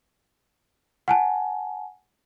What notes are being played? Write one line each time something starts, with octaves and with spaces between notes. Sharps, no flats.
F#5 G#5 A5